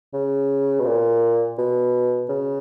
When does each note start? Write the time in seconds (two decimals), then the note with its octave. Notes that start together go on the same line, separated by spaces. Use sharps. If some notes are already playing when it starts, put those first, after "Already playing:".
0.13 C#3
0.79 B2
0.86 A#2
1.58 B2
2.29 C#3